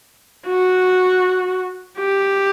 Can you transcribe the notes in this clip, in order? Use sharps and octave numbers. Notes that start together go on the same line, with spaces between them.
F#4
G4